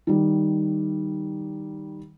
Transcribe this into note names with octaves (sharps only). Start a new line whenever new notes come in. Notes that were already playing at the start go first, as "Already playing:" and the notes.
D#3 G3